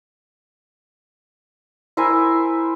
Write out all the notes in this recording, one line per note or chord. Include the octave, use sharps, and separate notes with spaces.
E4 A#4 C5 G#5